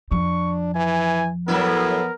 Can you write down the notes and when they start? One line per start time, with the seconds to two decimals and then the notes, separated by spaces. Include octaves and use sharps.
0.12 F2 F3 D4 C#6
0.75 E3 G#5
1.48 A2 F#3 B3 E4 A#4